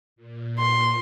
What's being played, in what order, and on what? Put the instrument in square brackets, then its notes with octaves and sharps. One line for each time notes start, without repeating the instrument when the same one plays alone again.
[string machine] A#2
[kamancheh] C6